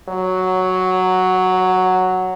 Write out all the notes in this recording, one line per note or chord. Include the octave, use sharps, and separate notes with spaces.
F#3